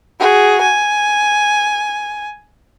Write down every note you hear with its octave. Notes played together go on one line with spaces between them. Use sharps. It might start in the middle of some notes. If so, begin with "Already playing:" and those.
F#4 G#4
G#5